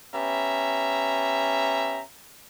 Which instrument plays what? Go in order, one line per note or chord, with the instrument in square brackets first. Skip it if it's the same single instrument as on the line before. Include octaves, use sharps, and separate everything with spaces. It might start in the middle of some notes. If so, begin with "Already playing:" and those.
[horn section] B3 C#4 G4 E5 A#5